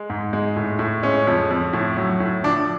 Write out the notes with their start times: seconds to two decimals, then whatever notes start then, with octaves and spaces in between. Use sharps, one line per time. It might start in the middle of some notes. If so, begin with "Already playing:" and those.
Already playing: G#3
0.10 G#2
0.33 G#3
0.56 A2
0.79 A2
1.03 G#3 C#4
1.27 F2
1.51 F2
1.73 A2
1.97 F#3
2.20 A2
2.43 F3 D4